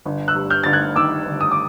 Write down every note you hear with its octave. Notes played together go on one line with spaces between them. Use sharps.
G1
E6 F#6
G2
F6 G6
G1 A6
F#6 G#6
D#3 D6 E6
G1
D#6
D6